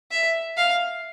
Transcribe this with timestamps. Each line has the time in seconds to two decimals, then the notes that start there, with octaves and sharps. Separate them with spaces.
0.11 E5
0.58 F5